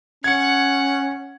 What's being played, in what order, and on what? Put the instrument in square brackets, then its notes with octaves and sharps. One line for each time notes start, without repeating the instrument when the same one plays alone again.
[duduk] C#4 [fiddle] F#5 [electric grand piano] G#6 C#7